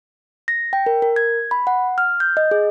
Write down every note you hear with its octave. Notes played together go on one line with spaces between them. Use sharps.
A#6
G5
A#4
A#4
G#6
B5
F#5
F6
G6
D#5
G#4